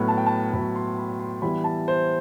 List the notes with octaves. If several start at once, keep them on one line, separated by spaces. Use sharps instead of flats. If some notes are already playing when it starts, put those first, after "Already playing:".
Already playing: A2 F#3 B3 B5
A5
G5
A5
A2 F#3 B3 B5
C6
B5
C6
E3 G3 B3 E4 B5
A5
C5